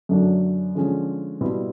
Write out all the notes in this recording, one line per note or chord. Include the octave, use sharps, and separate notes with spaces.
F#2 D3 F#3 A3 D4
D3 F3 G#3 C#4
B2 G3 C4 E4